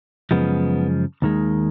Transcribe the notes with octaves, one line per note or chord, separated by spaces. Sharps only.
F#2 C#3 F3 G#3 B3
D#2 D#3 G#3